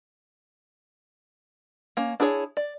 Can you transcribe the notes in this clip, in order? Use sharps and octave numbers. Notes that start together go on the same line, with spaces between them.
A#3 C#4
D4 E4 G#4 B4 C#5
D5